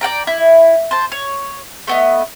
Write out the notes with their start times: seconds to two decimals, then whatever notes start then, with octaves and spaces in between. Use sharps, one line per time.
0.01 D5 F#5 G5 A#5
0.27 E4
0.91 C5 A5
1.12 C#5
1.87 A3 B3 D#5